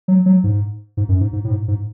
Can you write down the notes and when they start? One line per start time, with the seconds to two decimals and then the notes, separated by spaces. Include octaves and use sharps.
0.08 F#3
0.26 F#3
0.44 G#2
0.97 G#2
1.09 F#2
1.21 G#2
1.33 G#2
1.45 A2
1.50 G#2
1.68 G#2